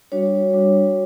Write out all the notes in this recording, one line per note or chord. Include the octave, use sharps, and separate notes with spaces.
G3 D4 F#4 C#5
G3 D4 F#4